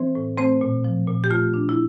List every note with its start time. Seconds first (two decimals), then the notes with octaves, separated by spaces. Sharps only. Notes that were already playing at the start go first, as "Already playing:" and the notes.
Already playing: E3 C4 C5
0.15 A2
0.38 A3 C4 C5
0.61 A#2
0.84 F3
1.07 A#2
1.24 G4
1.30 A3 F4
1.54 D4
1.69 E4